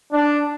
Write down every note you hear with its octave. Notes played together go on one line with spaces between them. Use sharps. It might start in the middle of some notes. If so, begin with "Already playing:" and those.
D4